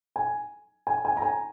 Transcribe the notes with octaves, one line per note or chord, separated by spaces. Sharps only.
G#5
G#5
G#5
A#5
G#5